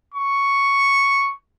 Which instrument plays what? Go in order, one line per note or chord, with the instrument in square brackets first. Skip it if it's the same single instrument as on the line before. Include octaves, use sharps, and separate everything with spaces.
[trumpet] C#6